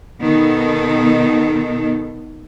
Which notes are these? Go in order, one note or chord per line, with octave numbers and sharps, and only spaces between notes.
B2 D#3 B3 D#4 A4